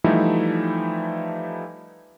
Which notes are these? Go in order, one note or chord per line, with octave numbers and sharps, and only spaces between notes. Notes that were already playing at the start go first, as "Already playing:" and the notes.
E3 F3 G3 A3 D#4 E4